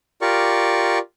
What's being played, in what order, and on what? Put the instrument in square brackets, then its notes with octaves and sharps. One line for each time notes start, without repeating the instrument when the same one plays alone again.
[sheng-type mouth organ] F4 G4 A#4 D5 C#6